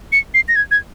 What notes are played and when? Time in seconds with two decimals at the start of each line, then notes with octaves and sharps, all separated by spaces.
0.12 C#7
0.34 C7
0.48 A#6
0.56 G#6
0.71 G#6